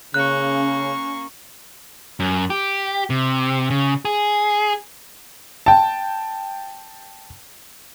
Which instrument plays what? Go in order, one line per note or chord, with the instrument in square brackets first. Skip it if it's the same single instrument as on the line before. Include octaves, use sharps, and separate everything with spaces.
[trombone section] C#3 [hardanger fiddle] A#3 C#6 [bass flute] C#4 [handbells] F#6
[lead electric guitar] F#2
G4
C3
C#3
G#4
[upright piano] G5 A5